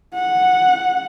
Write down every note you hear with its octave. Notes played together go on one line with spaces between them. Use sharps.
F#5